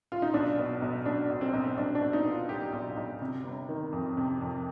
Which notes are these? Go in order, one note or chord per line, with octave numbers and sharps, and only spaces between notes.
F4
D#4
B1 D4
B2
B1
B2 D4
B1
C4
B1
B1 D4
D4
B2
D#4
B2
F4
B1 G4
B1
B1
C3
G1
D#3
F2
C3
F2